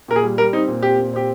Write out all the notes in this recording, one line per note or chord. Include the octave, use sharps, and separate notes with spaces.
A#2 A#4
G#4
G3
G3 A#4
C4 D#4
A#2
C4 G4
A#2
C4 G4